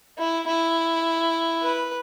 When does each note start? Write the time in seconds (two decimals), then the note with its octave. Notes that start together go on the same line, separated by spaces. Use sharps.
0.18 E4
0.47 E4
1.63 B4